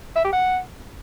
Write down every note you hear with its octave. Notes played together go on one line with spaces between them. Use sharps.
E5
G4
F#5